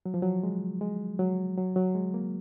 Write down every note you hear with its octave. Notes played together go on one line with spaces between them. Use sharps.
F#3
F3
F#3
G#3
G#3
F#3
F#3
F#3
G#3
A#3